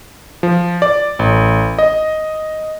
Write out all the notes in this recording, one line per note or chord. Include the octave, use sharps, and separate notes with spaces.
F3
D5
A1
D#5